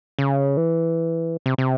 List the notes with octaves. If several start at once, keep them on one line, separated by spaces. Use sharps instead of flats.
C#3
E3
C3
C3